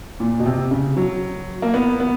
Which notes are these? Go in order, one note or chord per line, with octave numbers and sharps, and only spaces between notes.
A#2
B2
C3
C#3
F#3
A#3
B3
B3